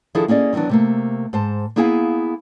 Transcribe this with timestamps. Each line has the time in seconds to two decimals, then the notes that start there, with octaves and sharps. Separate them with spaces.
0.15 D#3 F3 D4 E4 G#4 A4
0.28 A#3 C#4 G#4 D5 D#5
0.53 D#3 E3 F#3 B3 D4
0.69 C3 A3 A#3
1.33 G#2 C5 A5
1.76 A#3 B3 E4 G#4 F5 G#5